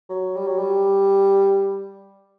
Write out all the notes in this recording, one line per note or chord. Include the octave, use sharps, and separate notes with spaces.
F#3
G3
F#3
G3